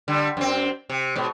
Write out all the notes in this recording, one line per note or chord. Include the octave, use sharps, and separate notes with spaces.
D3 G3
F#2 C4
C3
G#2 B2